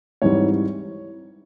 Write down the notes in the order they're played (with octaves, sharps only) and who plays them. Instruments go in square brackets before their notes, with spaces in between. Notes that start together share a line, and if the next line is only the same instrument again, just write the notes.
[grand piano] G#2 E3 G3 C4 C#5